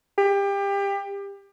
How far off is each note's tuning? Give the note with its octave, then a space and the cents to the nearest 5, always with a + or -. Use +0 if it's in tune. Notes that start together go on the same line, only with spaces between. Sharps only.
G4 +25